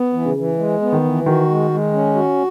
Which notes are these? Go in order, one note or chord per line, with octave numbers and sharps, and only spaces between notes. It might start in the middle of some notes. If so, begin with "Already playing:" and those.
Already playing: B3
E3
C#3
E3
G#3
B3
D#3
E3
D#3 F#4
G#3
G#3
C#4
F#4